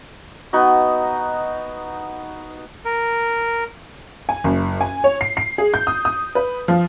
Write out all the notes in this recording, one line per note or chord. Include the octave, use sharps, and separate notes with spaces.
B3 D#4 F#4
A#4
G#5
F#1
G#5
C#5
C7
C7
G#4
G6
D#6
D#6
B4
F3